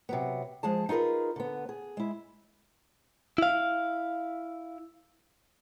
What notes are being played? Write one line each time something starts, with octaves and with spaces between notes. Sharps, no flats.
C3 F#3 B3
F3 G#3 G#4 A5
D#4 F4 G#4 A#4 B4
D3 B3
G#4
G#3 E4
E4 F5